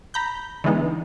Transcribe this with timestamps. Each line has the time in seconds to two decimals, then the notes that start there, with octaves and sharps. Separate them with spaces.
0.14 A#5 B5 G6
0.64 D3 E3 G#3 B3 D#4